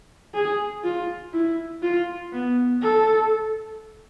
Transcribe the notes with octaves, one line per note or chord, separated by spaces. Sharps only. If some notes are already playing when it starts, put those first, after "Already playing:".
G#4
F4
E4
F4
B3
A4